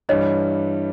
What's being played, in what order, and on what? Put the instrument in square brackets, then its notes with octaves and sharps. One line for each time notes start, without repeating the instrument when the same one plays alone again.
[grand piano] G2 E3 G3 [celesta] C#5 D#5